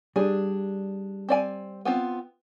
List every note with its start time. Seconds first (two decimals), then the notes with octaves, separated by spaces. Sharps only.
0.16 G3 D4 G#4
1.29 C4 D5 G#5
1.85 B3 C4 F4